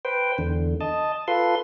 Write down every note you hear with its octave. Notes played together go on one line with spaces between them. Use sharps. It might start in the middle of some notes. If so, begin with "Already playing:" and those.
B4 C5 G5
E2 D3
D#5 A5
F4 A4 B4 C6